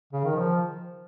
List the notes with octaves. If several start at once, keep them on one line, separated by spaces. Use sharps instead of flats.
C#3
D#3
F3